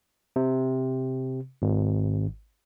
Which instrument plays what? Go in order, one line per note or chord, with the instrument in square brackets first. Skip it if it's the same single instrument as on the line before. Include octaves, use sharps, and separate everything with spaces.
[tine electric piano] C3
G#1